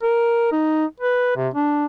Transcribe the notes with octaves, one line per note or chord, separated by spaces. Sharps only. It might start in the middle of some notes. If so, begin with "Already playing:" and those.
A#4
D#4
B4
C3
D4